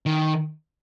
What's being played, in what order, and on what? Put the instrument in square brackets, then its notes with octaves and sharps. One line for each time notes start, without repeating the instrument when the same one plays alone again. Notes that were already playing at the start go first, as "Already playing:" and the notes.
[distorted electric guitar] D#3